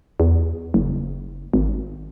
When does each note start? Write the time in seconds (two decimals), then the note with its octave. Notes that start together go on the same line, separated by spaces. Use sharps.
0.20 E2
0.74 F#1
1.54 G#1